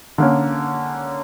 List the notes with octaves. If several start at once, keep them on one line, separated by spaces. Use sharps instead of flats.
D3 A#3 C#4